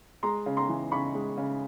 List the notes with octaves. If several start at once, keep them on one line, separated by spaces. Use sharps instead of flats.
G#3 A#5 C6
C#3
A#5 C6
E3
C#3 B5 C#6
G#3
C#3